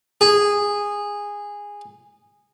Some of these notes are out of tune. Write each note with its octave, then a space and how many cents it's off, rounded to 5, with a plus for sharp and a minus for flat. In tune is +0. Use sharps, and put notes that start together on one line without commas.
G#4 -15